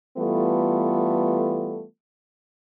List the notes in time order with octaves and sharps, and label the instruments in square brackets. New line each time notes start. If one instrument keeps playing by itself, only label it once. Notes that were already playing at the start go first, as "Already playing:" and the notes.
[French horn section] E3 G3 A3 B3 F4 A4